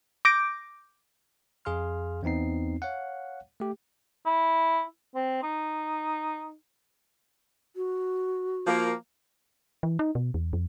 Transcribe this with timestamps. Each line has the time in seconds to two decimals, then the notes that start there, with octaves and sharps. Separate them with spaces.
0.25 D6 G6 A#6 D7
1.65 F2 G#4 F5 C6 F6
2.23 E2 B3 C4 D#4 C7
2.82 C#5 F5 F#5
3.60 A3 G4
4.26 E4
5.15 C4
5.43 D#4
7.75 F#4
8.67 F3 A#3
9.83 E3
9.99 D#4
10.15 B2
10.34 E2
10.53 F2